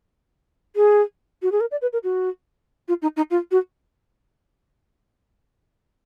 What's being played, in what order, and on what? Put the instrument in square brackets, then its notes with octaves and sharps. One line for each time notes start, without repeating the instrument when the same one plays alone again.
[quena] G#4
F#4
G#4
A#4
D5
B4
A#4
F#4
F4
D#4
D#4
F4
F#4